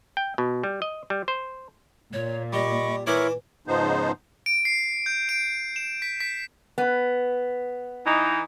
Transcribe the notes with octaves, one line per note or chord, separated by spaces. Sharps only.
G5
B2
G3
D#5
G3
C5
A#2 C#5
G3 D#5 B5 C#6 D6
E3 E4 A#4 C#5 E5 D6
G#2 C#3 F3 B3 D#4 C5
D7
C7
G6
D7
E7
B6
B6
B3
E3 D#4